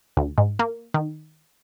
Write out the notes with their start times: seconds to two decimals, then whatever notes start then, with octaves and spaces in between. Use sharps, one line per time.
0.17 D2
0.38 G#2
0.59 A#3
0.94 D#3